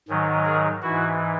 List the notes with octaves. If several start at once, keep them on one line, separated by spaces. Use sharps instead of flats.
G#2 D#3 F#3
G#4 A#4
G#2 E3 E4 F#4